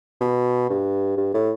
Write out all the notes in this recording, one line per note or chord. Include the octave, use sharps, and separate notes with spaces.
B2
G2
G2
A2